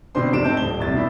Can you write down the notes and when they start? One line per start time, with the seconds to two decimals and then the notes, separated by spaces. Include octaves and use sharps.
0.15 B2 D3 C4 D4 C5 C6
0.32 F1 C3 A#3 D4 D7 E7
0.44 A2 C4 D#4 A5 G6
0.57 D#1 G7
0.80 C2 C3 A6
0.94 B2 D4 E4